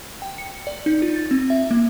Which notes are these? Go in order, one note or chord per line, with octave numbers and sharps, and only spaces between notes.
G5
C#7
D5
D#4
F4
A6
C4
E5
A#3